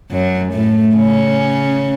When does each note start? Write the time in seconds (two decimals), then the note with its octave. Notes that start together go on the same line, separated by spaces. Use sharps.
0.11 F#2 F#3
0.53 A2 A3
0.96 C#3 C#4